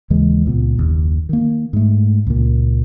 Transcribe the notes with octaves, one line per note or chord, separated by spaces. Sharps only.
D#2 C#3 E3 G#3
C#2 A#2 B3
F#1 D#2
D#3 A#3
G#2 A3
C#2 A#2